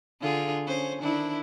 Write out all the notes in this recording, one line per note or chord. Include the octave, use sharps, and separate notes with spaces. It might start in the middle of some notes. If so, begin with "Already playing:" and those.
D3 F4 G#4
C#4 C5
D#3 D4 E4